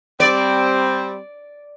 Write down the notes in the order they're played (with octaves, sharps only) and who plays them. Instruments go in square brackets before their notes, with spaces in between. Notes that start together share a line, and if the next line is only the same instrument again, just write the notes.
[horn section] G3 C4 [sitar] D5